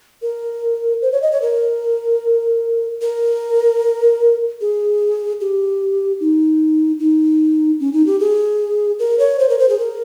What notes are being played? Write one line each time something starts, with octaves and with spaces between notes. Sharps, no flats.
A#4
C5
C#5
D#5
C#5
A#4
A#4
G#4
G4
D#4
D#4
C#4
D#4
G4
G#4
A#4
C#5
C5
A#4
C5
G#4
A#4